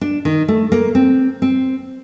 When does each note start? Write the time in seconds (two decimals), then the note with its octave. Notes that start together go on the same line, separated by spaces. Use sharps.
0.01 D4
0.25 D#3
0.48 A3
0.72 A#3
0.95 C4
1.42 C4